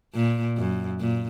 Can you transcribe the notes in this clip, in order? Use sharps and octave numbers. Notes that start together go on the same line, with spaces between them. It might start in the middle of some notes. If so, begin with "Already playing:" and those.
A#2
F#2
A#2